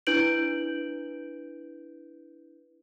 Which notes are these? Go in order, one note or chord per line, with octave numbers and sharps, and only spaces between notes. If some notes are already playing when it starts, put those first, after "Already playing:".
D4 E4 B4 G6 D7 F#7